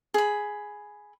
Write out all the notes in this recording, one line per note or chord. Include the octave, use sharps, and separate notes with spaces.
G#4 B5